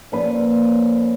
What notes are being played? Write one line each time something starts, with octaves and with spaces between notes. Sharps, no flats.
A#2 F3 A#3 C#4 B4